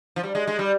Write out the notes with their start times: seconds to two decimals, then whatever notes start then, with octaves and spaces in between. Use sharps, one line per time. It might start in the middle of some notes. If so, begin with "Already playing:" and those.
0.16 F3
0.23 G3
0.35 G#3
0.47 G#3
0.59 G3